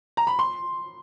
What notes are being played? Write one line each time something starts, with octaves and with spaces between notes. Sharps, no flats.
A#5
B5
C6